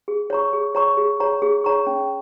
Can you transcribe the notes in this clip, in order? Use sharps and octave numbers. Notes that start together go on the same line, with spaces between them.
G#4
C#5 A#5 C#6
G#4
C#5 A#5 C#6
G#4
C#5 A#5 C#6
G#4
C#5 A#5 C#6
C#4